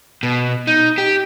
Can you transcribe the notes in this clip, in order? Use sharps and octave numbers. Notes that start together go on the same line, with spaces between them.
B2
D#4
G4